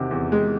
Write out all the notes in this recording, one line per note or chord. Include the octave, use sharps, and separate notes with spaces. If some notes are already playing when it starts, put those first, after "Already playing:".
Already playing: E2 C3 D#3 F#4 G4
E2
G#3